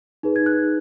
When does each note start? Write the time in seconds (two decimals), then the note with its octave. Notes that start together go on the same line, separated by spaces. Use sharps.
0.23 D#4 G#4 B4
0.36 G#6
0.46 F#6